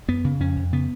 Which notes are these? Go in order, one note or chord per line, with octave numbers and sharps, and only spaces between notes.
F#2 B3
C#3
F2 C#4
F2
C#3 B3